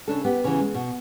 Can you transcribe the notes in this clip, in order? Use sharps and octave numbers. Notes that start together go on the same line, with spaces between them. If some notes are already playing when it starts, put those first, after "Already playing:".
C#3 D4 A4
B3 G4
C#3 E3
G#3
B2